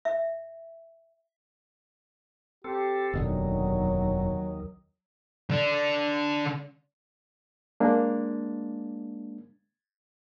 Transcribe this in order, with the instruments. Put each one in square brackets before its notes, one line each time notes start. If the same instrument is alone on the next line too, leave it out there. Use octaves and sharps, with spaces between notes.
[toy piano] E5
[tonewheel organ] C4 A4 [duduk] G4
[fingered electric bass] F1 B2 D3 [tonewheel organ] D#2 D#3 [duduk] F#3
[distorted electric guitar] D3 D4
[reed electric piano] G#3 A#3 D4